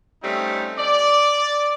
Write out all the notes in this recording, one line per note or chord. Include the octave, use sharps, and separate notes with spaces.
G3 A3 C4 C#4 D#4
D5